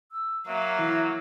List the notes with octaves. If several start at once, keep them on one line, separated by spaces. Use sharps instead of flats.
E6
F#3 A#3 E5
E3